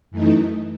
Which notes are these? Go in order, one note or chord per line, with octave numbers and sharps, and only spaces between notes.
F#2 E3 A3 D#4